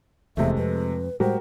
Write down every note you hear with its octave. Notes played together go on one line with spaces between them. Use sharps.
F1 E2 C3 G#3 A3 E5
F2 B4
A2 G3 G#3 F#4 G4 A#4 C5